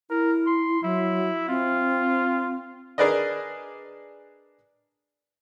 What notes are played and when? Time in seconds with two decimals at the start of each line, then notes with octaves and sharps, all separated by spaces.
0.10 E4 A#4
0.46 C6
0.83 F#3 E4
1.48 C4 F4
2.98 D4 G#4 A#4 B4 D5 D#5